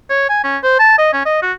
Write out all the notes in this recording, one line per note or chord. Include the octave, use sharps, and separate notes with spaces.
C#5
G#5
C#4
C5
A5
D#5
C#4
D#5
F#4